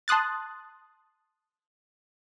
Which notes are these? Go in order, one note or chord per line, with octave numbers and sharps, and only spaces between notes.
A5 C6 D#6 F#6 A6